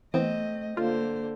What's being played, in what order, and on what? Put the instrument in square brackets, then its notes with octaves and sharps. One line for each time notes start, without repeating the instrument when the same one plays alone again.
[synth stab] E3 B3 [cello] A3 D#5 [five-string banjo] C4
[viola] D3 [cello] A#3 C5 [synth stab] F4